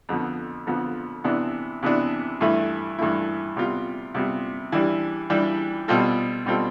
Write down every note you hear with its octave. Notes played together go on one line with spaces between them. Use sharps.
F2 D3 F3 B3
F2 D3 F3 B3
C3 E3 B3 D4
C3 E3 B3 D4
G2 E3 A3 E4
G2 E3 A3 E4
C3 G3 B3 F4
C3 G3 B3 F4
E3 G3 D4 G4
E3 G3 D4 G4
B2 G3 C4 F4 A4
B2 G3 C4 F4 A4